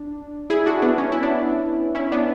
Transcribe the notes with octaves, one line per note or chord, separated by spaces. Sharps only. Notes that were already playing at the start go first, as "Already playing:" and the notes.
Already playing: D4
E4 G#4
D4 F#4
B3 D4
C#4
E4
B3 D4
C#4 E4
B3 D4